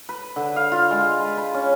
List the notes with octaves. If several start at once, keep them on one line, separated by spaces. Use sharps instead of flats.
B4
D3
F5
F4
G#3
B4
B4
C#4